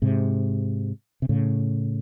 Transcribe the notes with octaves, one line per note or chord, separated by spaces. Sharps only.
G#2 C3
C3
A2 C#3